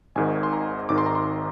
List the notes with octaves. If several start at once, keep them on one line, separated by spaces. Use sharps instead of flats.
G#1 G#2 D#3 G#5
C6
A#5
G#1 G#2 D#3 D6
C6
A#5
C6